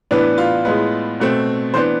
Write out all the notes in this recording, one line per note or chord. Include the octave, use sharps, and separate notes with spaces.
A2 E3 B3 D4 B4
F4
A2 G#3 B3
B2 A3 C4
E3 B3 D4 C5